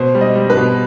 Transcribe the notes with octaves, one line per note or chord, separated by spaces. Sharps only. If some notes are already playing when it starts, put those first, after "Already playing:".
Already playing: B2 C5
G3
D#5
G3
B4
B2